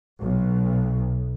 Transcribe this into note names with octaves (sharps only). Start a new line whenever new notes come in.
B1